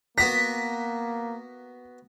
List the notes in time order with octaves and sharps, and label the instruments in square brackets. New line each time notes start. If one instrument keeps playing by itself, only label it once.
[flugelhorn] A#3 [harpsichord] B3 F#4 A#5 [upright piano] B6